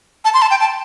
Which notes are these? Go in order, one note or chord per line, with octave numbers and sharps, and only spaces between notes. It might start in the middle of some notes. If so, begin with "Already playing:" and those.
A5
C6
A5
G5
A5